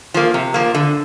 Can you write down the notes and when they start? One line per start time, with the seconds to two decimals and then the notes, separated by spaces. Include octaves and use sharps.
0.14 F3 A#3
0.34 C3
0.54 F3 A#3
0.75 D3